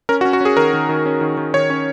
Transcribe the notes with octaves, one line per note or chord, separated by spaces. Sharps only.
C#4 A#4
F#4
C#4
F#4
C#4 G#4
D#3 A#4
D#3
D#3
C#4
D#3
D#3
D#3 C#5
C#4